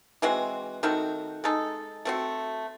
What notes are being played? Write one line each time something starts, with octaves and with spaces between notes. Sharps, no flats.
E3 G#3 C4 F#4
D#3 A3 C4 F#4
G#3 D#4 A4
A3 C4 F#4